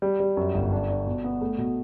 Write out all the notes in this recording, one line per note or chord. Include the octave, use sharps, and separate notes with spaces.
G3
G3
F#2
G1
D4
D4
B2
B3
A3
B2